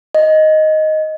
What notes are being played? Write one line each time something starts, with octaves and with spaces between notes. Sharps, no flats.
D#5